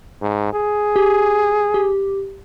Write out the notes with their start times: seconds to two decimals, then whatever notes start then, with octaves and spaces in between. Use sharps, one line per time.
0.22 G#2
0.53 G#4
0.96 G4
1.74 G4